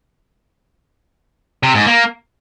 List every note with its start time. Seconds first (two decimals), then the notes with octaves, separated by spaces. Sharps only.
1.63 C3
1.75 G#2
1.86 A#3